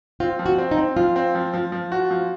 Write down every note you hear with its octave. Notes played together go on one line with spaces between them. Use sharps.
C4 F4
F3
F#4
C4
D#4
C4
F3 F4
C4
F3
F3
F3
F#4
F3